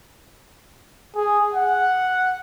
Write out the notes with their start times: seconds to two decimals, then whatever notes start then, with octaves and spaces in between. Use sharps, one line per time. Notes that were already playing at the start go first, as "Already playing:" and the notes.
1.16 G#4
1.54 F#5